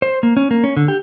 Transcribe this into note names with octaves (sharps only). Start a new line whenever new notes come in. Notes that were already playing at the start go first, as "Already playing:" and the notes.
C5
A#3
C#4
A#3
C#4
D3
G4